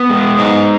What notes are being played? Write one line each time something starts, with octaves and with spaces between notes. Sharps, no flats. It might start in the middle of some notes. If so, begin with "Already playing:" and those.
Already playing: B3
G#3
D#4